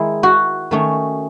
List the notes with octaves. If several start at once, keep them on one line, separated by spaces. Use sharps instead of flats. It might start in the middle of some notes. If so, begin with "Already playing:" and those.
Already playing: D#3 G#3 D#4 E4
F#4
D#3 A3 C#4